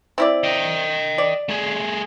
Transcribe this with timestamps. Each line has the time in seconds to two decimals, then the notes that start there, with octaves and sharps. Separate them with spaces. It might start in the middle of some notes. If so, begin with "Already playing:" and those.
0.18 C4 E4 D5
0.44 D#5 G5
1.18 D5
1.49 A3 G#4